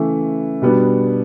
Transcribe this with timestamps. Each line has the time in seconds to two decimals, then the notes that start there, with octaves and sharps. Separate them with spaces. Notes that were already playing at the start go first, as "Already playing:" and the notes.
Already playing: C#3 E3 A3
0.62 B2 G3 B3 D4